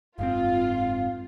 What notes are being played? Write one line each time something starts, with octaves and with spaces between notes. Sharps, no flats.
F#1 G#2 C4 F4 F5